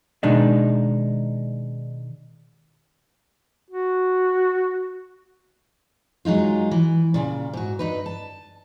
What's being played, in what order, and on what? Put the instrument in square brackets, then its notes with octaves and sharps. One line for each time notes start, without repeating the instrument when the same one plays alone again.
[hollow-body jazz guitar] B2 D#3 G#3 D4 D#4
[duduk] F#4
[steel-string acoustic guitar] F#3 G#3 D#4 F4
E3
A#2 C#3 G3
G#2 F#4
G2 D#4 B4
A5